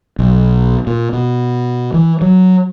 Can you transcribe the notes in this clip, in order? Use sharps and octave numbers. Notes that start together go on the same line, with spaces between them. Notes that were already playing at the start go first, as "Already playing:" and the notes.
B1
A#2
B2
E3
F#3